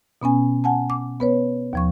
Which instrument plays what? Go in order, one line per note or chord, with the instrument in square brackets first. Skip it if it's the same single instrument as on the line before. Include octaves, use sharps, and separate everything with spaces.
[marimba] B2 B3 C#4 G#5
F#5 G#5 A5
D6
B3 B4 C#5
D#2 F3 C#6